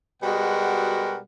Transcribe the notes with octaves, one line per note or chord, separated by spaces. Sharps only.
B2 G3 G#3 F#4 A#4 F#5